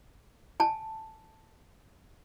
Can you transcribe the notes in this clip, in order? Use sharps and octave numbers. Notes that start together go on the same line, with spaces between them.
G#5 A5